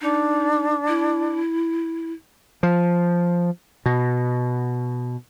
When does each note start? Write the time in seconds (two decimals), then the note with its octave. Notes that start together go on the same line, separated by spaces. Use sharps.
0.02 D4 D#4
0.88 E4
2.63 F3
3.86 B2